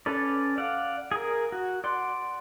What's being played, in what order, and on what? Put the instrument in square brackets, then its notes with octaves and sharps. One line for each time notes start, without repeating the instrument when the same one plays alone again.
[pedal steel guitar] C#4 A4 B4 D5
D5 F5 F#5
G#4 A#4
F#4
D5 F#5 C6